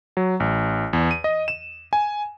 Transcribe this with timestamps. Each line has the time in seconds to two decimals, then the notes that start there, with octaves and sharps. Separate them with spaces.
0.17 F#3
0.40 A1
0.93 E2
1.11 D#7
1.24 D#5
1.48 E7
1.93 G#5